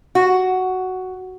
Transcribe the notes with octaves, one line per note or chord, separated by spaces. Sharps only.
F#4